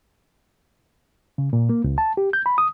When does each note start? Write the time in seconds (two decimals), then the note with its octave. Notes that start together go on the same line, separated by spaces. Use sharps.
1.38 C#3
1.53 A#2
1.69 A#3
1.84 C#2
1.98 A5
2.17 G4
2.33 G6
2.46 B5
2.58 D#6